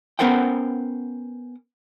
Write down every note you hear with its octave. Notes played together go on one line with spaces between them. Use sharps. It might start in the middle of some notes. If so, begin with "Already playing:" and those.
B3 C#4 A#4 C5 F#5 G5